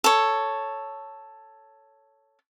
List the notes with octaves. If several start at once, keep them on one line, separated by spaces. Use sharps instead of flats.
A4 C#5